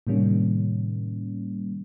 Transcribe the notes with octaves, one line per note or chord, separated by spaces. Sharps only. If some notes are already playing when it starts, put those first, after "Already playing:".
A2 C3 D#3 G3 A#3 C#4